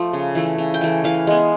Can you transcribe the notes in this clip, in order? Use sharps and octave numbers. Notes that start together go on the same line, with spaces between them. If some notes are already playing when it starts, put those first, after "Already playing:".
Already playing: F3 A3
C#3
E3 A3
C#3
G5
E3 A3
E3 F5
G#3 B3